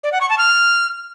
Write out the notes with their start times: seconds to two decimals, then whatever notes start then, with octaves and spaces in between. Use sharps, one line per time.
0.04 D5
0.12 F#5
0.21 C#6
0.30 A5
0.38 F6